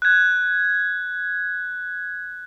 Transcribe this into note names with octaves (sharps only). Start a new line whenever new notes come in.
F#6 G#6